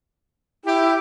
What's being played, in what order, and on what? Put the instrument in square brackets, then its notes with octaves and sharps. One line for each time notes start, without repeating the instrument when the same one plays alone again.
[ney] E4 [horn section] G4